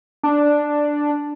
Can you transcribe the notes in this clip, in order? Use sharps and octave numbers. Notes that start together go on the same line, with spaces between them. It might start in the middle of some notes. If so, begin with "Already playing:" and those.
D4